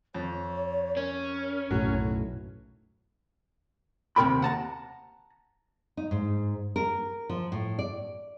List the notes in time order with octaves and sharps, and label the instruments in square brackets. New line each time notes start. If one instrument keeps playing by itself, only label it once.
[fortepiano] F2 [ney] C#5
[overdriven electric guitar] C#4 [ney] A#4
[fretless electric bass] B1 F#2 A2 [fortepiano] F#3
[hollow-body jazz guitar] D#2 C3 C#4 A#4 G5 B5
F#5 A5 A#5
[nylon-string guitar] D#4
G#2
A#4
F3
A2
D5